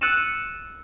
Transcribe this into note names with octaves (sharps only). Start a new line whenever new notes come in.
E6 F#6 A6 C#7 D#7 E7